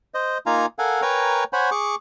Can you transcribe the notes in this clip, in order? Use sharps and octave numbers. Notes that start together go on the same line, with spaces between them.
C5 D#5
A#3 D#4 F4 F5 G#5 A#5
A4 A#4 F5 F#5 G#5
A#4 B4 C#5 G5 G#5 A#5
C5 C#5 F#5 G#5 B5
G#4 C#6 D6